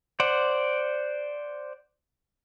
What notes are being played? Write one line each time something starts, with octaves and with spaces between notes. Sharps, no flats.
C5 D5 F#5